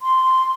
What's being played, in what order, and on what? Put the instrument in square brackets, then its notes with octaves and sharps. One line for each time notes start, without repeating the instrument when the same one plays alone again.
[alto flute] C6